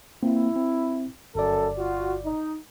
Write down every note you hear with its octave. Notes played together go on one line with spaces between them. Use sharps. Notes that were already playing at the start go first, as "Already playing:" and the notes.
A#3 C4 E4
C4
G1 F#2 A4 D5
F4 F#4
D#4